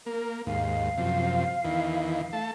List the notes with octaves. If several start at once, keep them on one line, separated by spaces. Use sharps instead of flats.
A#3 A#4
D#2 G#2 F5
F#2 C3 F3
E2 D#3 E3
A3 A5